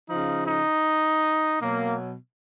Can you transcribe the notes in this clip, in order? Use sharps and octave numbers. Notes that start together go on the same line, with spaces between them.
C#3 F3 D#4
D#4
B2 F#3 A#3